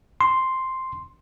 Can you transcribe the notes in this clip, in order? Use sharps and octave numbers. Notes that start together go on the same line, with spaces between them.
C6